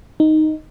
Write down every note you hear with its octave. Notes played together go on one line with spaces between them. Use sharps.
D#4